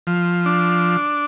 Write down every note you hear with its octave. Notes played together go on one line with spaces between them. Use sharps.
F3
D4